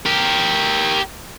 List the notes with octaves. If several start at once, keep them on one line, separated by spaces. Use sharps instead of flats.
G4 A#4